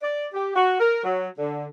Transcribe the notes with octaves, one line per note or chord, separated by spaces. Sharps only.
D5
G4
F#4
A#4
F#3
D3